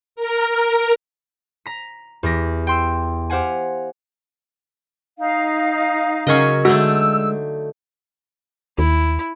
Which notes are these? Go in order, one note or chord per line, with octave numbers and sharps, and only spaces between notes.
A#4
A#5 B6
E2 G4 A#6 B6
G5 C6 E6
G4 C5 F5 F#5 G#5
D#4 F5
C#3 F#3 C#4 A#4 D#5 C#6
D3 G#3 A3 D#4 F#4 E6
D#2 E4